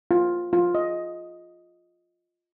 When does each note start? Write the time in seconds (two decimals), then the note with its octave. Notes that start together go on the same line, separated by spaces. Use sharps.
0.11 F4
0.53 F4
0.75 D#5